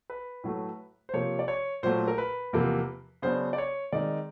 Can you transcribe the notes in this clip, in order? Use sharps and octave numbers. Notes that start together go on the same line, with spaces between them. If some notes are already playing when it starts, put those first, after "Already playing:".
B4
A2 F#3 A3
C5
C3 F3 A#3 C#5
D5
C#5
A#2 F#3 A3 C5
A#4
B4
E2 C3 F3 A#3
C#3 F#3 B3 D4 C5
D5
C#5
D#3 G#3 C4 D#4 D5